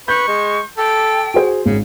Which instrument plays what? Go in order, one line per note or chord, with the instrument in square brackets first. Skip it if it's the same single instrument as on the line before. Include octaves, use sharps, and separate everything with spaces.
[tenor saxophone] B4 [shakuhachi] C#6 [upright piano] G6
[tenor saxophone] G#3
[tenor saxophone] A4 [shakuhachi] G5
[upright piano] F#4 G#4 C5
[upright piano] G#1 [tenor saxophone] C#3